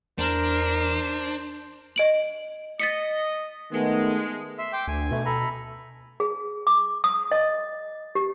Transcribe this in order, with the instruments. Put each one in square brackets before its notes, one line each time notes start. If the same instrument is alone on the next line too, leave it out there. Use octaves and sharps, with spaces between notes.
[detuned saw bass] E2 [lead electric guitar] D4 [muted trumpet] A#4 [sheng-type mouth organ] C5
[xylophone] D#5 D7 F#7
[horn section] D#5 [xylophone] A6 B6 C#7
[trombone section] D#3 A3 B3 [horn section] G#3
[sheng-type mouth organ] E5 C6
G5 C6 D6
[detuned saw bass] D2 [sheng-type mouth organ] G#5
[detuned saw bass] B2 [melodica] A3
[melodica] A4 A#5 B5
[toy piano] G#4
D6
D#6
D#5
G4